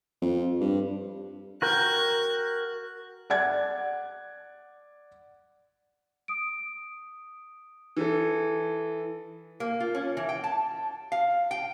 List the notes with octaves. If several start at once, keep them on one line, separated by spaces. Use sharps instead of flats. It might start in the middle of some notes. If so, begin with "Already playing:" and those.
F2
G2
F#4 A#4 G5 F#6 G#6
D5 F#5 G#6
D#6 D7
E3 A4
A#3
F4
C#4
E3
G5
A5
F5
G5